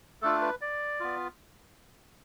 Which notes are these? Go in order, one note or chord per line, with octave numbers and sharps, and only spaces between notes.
A3 D4 F4 A4
B4
D5
B3 F4